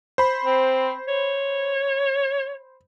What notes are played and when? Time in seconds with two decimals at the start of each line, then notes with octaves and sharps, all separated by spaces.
0.18 C5 B5
0.45 C4
1.08 C#5